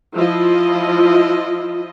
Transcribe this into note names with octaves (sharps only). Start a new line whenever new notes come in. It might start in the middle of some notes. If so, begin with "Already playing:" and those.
F3 E4 F4 D#5